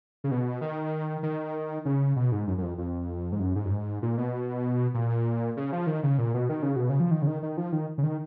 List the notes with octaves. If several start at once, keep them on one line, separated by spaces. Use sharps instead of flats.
C#3
B2
D#3
D#3
C#3
B2
G#2
F#2
F#2
F2
F2
G#2
F#2
G#2
F#2
G#2
A#2
B2
A#2
C#3
F3
D#3
C#3
A#2
B2
D#3
C#3
B2
C#3
F3
D#3
C#3
D#3
D#3
F3
D#3
C#3
D#3